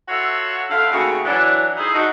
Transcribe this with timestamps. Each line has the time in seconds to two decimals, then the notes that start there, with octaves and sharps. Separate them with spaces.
0.09 F4 F#4 A4 C#5 E5 F#5
0.71 F2 D3 E5 F5
0.92 D#2 C#3 A3 F#4
1.24 E3 F#3 D4
1.77 D#4 E4 G#4 C5 D#5 E5
1.94 D4 D#4 F#4